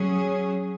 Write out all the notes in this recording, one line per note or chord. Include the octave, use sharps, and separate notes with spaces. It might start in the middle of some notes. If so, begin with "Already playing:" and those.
Already playing: F#3 C#4 G#4